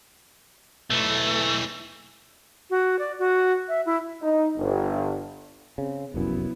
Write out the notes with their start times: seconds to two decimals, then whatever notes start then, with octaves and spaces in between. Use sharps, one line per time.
0.90 B1 E3 A3
2.70 F#4
2.99 D5
3.19 F#4
3.68 E5
3.86 E4
4.22 D#4
4.58 G1
5.78 C#3 C4
6.14 F1 C2 F#2 B3 E4